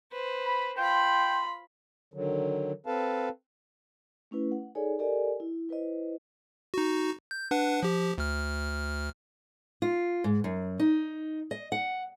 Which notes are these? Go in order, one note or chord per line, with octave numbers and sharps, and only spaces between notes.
B4 C5
B5
F4 G5 B5 C6
D3 D#3 F#3
C4 A4 B4 F5 A5
A3 C#4 E4 B4
F#5
D#4 G#4 A4 C#5 D5 G#5
G4 A4 A#4 D5 D#5 G#5
E4
E4 B4 C5 D#5
D#4 F#4
G6
D4 B4 F#5
F3 G4
D2 F6
F4
G#2
F#2
D#4
D#5
F#5